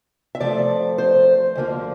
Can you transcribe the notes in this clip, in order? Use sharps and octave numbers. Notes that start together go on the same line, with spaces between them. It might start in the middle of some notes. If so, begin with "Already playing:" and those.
E5
C3 F3 A3 D5
C5
D2 D3 F3 A#3